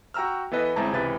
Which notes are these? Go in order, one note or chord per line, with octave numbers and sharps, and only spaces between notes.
F#4 G5 A#5 E6 F6
E3 B3 A4 B4 D#5
G1 G#3 C4 E4 A5 A#5
C#2 C3 E3 B4 A6